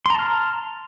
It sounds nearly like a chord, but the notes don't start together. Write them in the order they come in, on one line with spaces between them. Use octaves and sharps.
C6 A#5 A5 F6